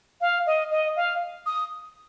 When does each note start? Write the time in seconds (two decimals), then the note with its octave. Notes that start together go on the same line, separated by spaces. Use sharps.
0.21 F5
0.46 D#5
0.71 D#5
0.96 F5
1.46 D#6